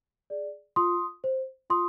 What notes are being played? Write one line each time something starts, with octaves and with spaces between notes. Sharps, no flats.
G#4 D5
F4 C6 D#6
C5
F4 C6 D#6